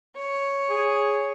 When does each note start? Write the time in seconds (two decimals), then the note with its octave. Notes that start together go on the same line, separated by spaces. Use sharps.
0.16 C#5
0.70 G#4